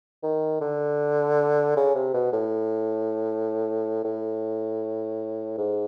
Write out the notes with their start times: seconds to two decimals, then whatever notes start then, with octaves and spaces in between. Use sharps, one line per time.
0.23 D#3
0.61 D3
1.76 C#3
1.95 C3
2.14 B2
2.32 A2
4.04 A2
5.58 G#2